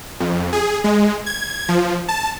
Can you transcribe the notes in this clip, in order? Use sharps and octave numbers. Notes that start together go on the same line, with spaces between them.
F2
G#4
G#3
G#6
F3
A5